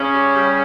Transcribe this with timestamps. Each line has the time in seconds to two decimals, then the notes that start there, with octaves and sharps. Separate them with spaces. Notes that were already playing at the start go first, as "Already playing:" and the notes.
Already playing: C#3 C#4
0.13 G3
0.35 G3